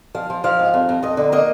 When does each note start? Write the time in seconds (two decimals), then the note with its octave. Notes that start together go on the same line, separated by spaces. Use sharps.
0.15 F3 F5
0.30 F3
0.44 F3 F5
0.59 G#2
0.74 F2
0.89 F2
1.03 F2 D#5
1.17 D3
1.32 A#3 D#5